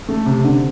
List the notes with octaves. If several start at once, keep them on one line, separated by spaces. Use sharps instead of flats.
A3
C3
D3